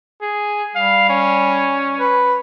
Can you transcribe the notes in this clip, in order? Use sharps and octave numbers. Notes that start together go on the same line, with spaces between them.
G#4
G3 F5
C#4
B4